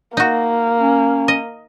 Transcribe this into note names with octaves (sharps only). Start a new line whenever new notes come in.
A#3 D#4 F#4
C#4
D#5